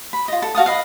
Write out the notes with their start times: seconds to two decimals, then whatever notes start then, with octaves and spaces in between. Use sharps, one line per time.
0.13 B5
0.28 F4 D#5
0.42 A4
0.55 F#4 F5 A5 D#6
0.66 B4 D#5 F5